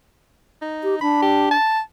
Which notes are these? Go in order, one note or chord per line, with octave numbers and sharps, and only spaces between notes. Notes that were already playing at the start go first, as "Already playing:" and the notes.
D#4
G4
D4 B5
G4
A5